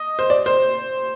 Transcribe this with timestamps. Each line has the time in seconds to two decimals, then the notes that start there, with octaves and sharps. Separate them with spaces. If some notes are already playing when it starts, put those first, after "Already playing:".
Already playing: D#5
0.19 C5
0.30 D5
0.46 C5